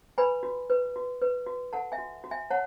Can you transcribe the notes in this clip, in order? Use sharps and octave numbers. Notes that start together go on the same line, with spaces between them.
B4 G#5 B5
F#4
B4
F#4
B4
F#4
A4 F#5 A5
E5 G#5
F#4
F#4
E5 G#5
C#5 F#5 A5